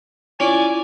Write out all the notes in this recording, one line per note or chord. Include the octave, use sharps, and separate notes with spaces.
C#4 E4 F4 D5 G#5 D7